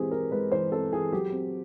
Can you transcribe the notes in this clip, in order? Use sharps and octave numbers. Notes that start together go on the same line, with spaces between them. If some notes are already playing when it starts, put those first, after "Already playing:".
Already playing: E3 G#3 C4 G4 G#4
E3 A#4
G#3 B4
E3 C5
C4 A4
E3 G#4
F#3 G4
C4